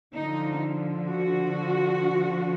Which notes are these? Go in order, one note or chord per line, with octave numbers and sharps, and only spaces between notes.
D3 F3 D#4
F#4